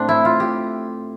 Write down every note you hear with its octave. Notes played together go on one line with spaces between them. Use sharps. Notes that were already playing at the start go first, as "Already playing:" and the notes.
Already playing: A2 C4 D4
E4
F4
G4